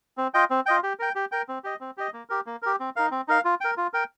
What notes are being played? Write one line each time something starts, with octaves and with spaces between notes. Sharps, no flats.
C4
F4 D#5 G5
C4
F4 D#5 G5
G4
A#4 G5
G4
A#4 G5
C4
G4 D#5
C4
G4 D#5
A#3
G4 A#4
A#3
G4 A#4
C4
D#4 A#4 F5
C4
D#4 A#4 F5
F4
A#4 G5
F4
A#4 G5